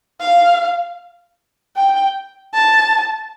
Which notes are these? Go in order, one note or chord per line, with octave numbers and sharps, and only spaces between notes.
F5
G5
A5